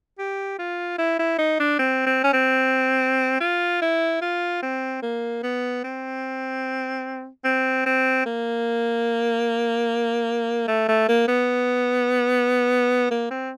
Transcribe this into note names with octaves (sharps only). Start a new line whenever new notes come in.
G4
F4
E4
E4
D#4
D4
C4
C4
C#4
C4
F4
E4
F4
C4
A#3
B3
C4
C4
C4
A#3
A3
A3
A#3
B3
A#3
C4